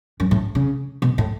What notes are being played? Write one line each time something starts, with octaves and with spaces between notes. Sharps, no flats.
F#2
A2
C#3
B2
A2